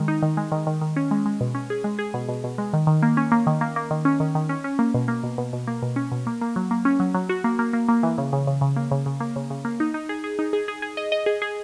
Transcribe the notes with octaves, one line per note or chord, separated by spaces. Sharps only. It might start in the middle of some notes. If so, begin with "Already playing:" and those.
Already playing: D#3 G#3
D#4
D#3
G#3
D#3
D#3
D#3
C#4
G#3
G#3
B2
C#4
G#4
G#3
G#4
B2
B2
B2
G#3
D#3
D#3
A#3
C#4
A#3
D#3
A#3
A#3
D#3
C#4
D#3
D#3
C#4
C#4
A#3
B2
A#3
B2
B2
B2
A#3
B2
C#4
B2
A#3
A#3
F#3
A#3
C#4
F#3
F#3
F#4
A#3
A#3
A#3
A#3
E3
C#3
C#3
C#3
C#3
A#3
C#3
C#3
A#3
C#3
C#3
A#3
D#4
D#4
G#4
G#4
D#4
G#4
G#4
G#4
D#5
D#5
G#4
G#4